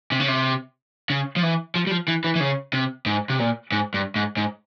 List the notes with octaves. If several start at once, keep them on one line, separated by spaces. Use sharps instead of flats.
C3
C#3
C3
C#3
F3
E3
F3
G3
F3
E3
E3
E3
C#3
C3
G#2
C3
A#2
G#2
G2
G#2
G#2